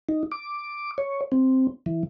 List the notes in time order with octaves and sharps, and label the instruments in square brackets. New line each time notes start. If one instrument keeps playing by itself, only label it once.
[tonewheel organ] D#4
D6
C#5
C4
E3